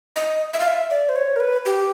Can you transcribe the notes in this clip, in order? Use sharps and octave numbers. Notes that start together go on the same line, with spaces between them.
D#5
E5
F5
E5
D5
C5
C#5
A#4
B4
G4